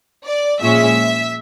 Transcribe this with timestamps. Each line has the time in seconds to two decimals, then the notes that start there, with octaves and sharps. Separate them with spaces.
0.26 D5
0.62 A#2 F3 G#3 C#4 E5